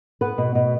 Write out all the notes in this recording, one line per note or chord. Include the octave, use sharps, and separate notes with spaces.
B3 B4
B2
B2